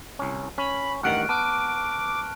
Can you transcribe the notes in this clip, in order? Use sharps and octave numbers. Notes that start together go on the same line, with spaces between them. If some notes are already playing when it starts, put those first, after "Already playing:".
C2 C#4
C#4 B5 C#6
A1 G2 D#3 F#5 F6 F#6 D7
B3 A5 D6 F6 F#6